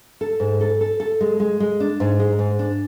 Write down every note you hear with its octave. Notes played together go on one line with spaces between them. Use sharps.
A4
G#2
A4
A4
A4
G#3
G#3
G#3
D4
G#2
G#3
G#2
D4